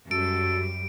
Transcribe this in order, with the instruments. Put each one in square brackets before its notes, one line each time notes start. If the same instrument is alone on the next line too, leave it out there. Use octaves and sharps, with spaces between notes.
[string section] F#2 G3 [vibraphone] F#4 [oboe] A4 [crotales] D7